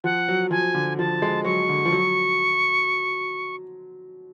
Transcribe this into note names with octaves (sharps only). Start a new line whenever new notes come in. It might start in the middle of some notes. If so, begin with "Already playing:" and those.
F3 F#5
F#3
F3 G#5
D3
F3 A5
G#3
F#3 C#6
D3
F3
F#3